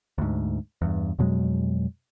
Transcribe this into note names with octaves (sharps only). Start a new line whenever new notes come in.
D2 G#2
E2 G2
F2 B2 F#3 G#3